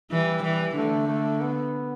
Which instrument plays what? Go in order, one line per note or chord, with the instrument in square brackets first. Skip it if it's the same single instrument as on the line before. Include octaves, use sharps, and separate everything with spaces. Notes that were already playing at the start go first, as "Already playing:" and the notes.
[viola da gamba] E3 [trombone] G3
[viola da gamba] E3
[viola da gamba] D3 [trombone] A3
[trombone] A3
B3